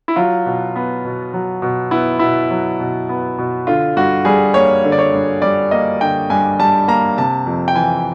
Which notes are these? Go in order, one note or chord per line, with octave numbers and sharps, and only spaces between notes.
E4
F#3 F4
B2
B3
B2
F#3
B2
B3 E4
B2 E4
F#3
B2
B3
B2
D3 F4
G2 F#4
G3 G#4
A#3 C#5
D3
D5
C#5
G2
G3 D5
A#3 D#5
D3 G5
G2 G#5
G3 A5
A#3 A#5
C3 A5
F2
G5
E3 G#5